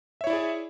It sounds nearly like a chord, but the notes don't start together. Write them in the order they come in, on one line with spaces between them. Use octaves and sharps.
E5 C#5 E4 D5 G#4